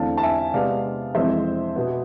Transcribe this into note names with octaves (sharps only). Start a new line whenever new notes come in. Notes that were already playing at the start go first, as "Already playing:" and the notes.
Already playing: E2 D3 A3 C4 F5 A5
A5
E5 G#5
C3 G#3 B3 D5 F5
F2 E3 G#3 C4 C5 E5
B2 B3